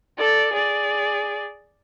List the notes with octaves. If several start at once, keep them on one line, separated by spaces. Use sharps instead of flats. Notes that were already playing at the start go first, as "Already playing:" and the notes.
A4 D5
G#4 D5